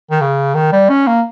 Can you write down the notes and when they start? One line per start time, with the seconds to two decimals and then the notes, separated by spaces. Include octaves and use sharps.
0.11 D#3
0.21 C#3
0.55 D#3
0.72 G3
0.89 C#4
1.07 A#3